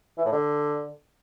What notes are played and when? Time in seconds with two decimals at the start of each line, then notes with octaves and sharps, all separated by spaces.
0.18 E3
0.25 A2
0.32 D3